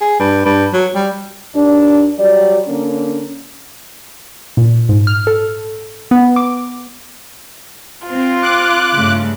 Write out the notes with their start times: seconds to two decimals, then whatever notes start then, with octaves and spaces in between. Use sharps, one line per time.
0.01 G#4
0.20 G2
0.46 G2
0.73 F#3
0.95 G3
1.54 D#2 D4
2.19 F#3 G3 D5
2.67 D3 A#3 C#4
4.57 A#2
4.89 G#2
5.07 F6
5.27 A4
6.11 B3
6.36 D6
8.07 C4 F4
8.43 D6 F#6
8.94 G2 C#3 A3